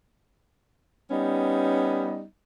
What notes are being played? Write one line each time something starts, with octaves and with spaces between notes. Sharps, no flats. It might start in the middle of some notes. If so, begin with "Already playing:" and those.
G3 B3 C#4 D#4